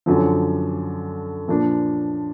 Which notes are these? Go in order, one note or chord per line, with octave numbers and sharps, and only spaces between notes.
F#2 D3 F3
A#2 F3 A#3 D4